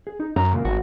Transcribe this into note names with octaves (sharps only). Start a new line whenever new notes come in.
G#4
D#4
F#2 A#5
C#2 A#2 A#3
G#1 F#4